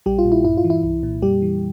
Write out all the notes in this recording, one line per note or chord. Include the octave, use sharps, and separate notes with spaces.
A#1 G3 G4
F4
A#2
E4
G2 E4
F4
E3
E4
C2
A#2
F2 G3 G4
E3